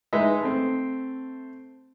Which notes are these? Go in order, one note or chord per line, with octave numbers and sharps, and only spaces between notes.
G#3 D#4 E4 B4 D#5 E5
A3 C4